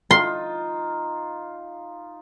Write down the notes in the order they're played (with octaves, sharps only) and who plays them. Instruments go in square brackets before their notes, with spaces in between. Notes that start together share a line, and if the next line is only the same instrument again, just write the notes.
[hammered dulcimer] D#4 F4 [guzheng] C6